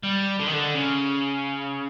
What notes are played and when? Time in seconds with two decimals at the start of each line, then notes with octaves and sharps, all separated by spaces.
0.03 G3
0.39 D3
0.46 D#3
0.53 D3
0.74 C#3